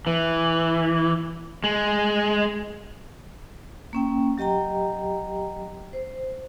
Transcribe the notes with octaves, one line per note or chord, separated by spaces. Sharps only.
E3
G#3
A#3 C#4 G5
F#3 G4 D#5 G5 A#5
C5